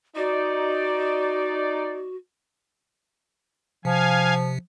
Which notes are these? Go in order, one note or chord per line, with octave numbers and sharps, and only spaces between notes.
D#4 F#4 D5
C3 F3 F5 G#5